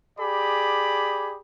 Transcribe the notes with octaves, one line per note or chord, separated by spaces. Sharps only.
G4 G#4 D5 B5